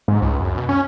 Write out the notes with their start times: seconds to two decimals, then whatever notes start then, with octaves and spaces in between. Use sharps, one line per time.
0.08 G#2
0.22 C#2
0.40 F#2
0.57 B2
0.69 C#4